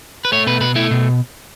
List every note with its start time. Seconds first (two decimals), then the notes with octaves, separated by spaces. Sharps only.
0.25 B4
0.32 A3 C#5
0.47 B2 B4
0.61 B2 B4
0.75 A3 E4
0.91 B2